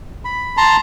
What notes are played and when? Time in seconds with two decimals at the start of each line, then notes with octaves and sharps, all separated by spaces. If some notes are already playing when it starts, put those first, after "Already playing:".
0.25 B5
0.57 A5 A#5 C6